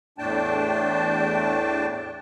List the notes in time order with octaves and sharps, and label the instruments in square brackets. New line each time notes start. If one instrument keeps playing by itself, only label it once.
[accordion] E2 A2 A3 D4 G5 A5